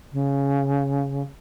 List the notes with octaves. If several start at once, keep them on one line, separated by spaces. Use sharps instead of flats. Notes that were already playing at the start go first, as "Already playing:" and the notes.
C#3